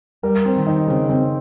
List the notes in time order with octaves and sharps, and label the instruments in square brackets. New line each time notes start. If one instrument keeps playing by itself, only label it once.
[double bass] G3 [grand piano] A#4
[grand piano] C4
[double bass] D#3
[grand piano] D#4
[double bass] C#3 [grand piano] C4
[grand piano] C4